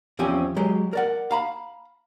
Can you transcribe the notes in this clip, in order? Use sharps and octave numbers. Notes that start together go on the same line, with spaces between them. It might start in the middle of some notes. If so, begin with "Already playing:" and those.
E2 F3 C4 C#4 G4 G#5
F#3 G#3 G4
A#4 D5 F#5
F5 A#5 B5